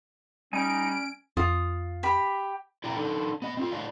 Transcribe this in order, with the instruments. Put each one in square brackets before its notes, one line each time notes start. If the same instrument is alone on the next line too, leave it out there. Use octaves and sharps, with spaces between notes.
[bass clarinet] G3 [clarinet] C#4 [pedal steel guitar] D#4 G#5 [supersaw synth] D7
[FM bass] F2 [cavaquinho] F4 D#6
[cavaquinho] G4 B5
[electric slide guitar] E4 D5 G5 A#5
D4 D#4 A4
B3 D#5
C4 D#4 F4
D4 E4 D5 D#5 F5